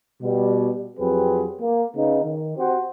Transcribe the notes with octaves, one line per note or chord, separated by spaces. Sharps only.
B2 G3
F2 F#3 C4 G4 G#4 B4
A#3
C#3 B3 D#4
D#3
C4 F#4 G4 C5